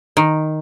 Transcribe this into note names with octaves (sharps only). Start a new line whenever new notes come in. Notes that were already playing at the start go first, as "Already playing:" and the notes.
D#3